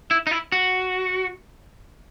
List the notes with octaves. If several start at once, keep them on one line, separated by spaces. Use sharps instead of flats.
E4
D#4
E4
F#4